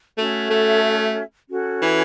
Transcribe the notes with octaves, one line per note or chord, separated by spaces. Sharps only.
A3 C#4 F#4 A4 E5
A3
C#4 F#4 A4
E3